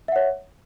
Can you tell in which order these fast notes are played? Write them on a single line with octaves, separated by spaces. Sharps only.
E5 F#5 C#5